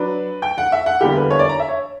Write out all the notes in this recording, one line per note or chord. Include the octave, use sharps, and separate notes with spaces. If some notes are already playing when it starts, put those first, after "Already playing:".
Already playing: F#3 D4 B4
G5
F#5
E5
F#5
E2 D3 G3 A#3 E4 G4
B4
C#5
D5
A#5
E5
C#5